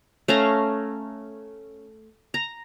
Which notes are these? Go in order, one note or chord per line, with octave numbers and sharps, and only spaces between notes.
A3 C#4 F5 A#5
A#5